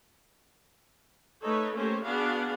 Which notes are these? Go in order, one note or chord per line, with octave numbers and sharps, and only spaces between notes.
A3 D#4 A4 B4 C#5
A3 A#3 C#4 G4 C5 C#5
B3 D4 F#4 G#4 F5 F#5